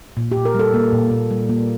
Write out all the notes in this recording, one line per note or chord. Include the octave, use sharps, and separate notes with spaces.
A#2
G4
A#2
A#4
G3 A4
A#3
A#2
A#2
G3
A#3